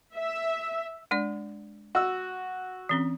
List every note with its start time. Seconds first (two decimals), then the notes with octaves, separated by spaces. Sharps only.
0.15 E5
1.11 G#3 D4 D5
1.95 F#4 E6
2.89 E3 C4 C#4